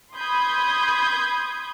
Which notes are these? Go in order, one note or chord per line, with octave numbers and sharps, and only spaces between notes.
B5 C6 D#6 G6 G#6